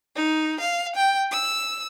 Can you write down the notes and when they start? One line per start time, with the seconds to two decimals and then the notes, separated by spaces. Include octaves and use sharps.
0.16 D#4
0.59 F5
0.95 G5
1.31 E6